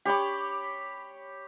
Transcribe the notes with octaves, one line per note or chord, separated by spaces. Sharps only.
G4 C#5 B5 D6